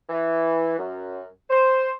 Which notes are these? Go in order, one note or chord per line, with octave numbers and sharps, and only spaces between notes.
E3
F#2
C5